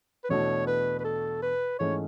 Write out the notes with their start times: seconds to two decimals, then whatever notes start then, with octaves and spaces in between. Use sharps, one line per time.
0.24 B4
0.29 E2 B2 A3 D4 F#4 C#5
0.67 B4
1.00 B4
1.04 A4
1.42 B4
1.79 G#2 E3 A3 C#4 G#4 C#5